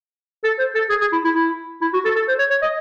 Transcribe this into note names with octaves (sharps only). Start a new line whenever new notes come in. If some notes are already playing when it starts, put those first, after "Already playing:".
A4
C5
A4
G#4
G#4
E4
E4
E4
E4
F#4
A4
A4
C5
C#5
C#5
D#5